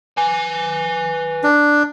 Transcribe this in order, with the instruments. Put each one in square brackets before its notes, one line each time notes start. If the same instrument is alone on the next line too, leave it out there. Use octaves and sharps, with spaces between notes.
[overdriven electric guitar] B4 G#5
[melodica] D4